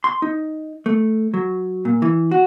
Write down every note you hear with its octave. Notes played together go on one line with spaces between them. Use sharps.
C6
D#4
A3
F#3
A#2
E3
F#4